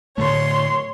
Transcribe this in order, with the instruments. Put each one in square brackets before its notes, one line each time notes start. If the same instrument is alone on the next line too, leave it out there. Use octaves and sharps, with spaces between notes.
[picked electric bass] A2 D3 A3 [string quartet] C#5 C6